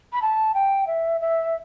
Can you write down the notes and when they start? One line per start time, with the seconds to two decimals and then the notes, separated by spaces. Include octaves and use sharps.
0.13 B5
0.22 A5
0.54 G5
0.87 E5
1.21 E5